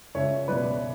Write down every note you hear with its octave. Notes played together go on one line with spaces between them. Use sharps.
C#2 C#5 E5
B2 F#3 B4 D5